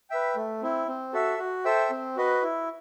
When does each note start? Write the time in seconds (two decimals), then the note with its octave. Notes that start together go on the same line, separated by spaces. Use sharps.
0.10 B4 E5 G5
0.36 A3
0.62 C4 E4
0.88 C4
1.13 F#4 A4 E5
1.39 F#4
1.64 A4 C5 E5 G5
1.91 C4
2.17 F#4 B4 D#5
2.43 E4